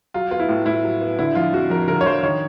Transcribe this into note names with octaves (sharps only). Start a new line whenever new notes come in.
F#3 F4
B3 F4
E4
A2
A2 E4
F#3
B3
D3 E4
F3 F4
F2 F#4
F2 A#4
D3 A#4
C#5
F3 C5
D#3 C#5